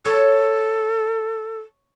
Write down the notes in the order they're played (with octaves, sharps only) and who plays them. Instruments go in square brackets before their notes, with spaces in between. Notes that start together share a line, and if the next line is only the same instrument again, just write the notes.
[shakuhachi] A4 [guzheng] C#5